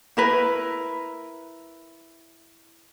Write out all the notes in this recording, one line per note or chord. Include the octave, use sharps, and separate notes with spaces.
E4 A#4 B4